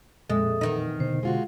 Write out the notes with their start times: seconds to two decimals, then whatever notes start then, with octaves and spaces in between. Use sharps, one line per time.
0.30 F2 A#2 G#3 A4 E5 D#6
0.61 E2 D#3 D#4
1.00 B2 D3 C5
1.23 G#3 F4 F#4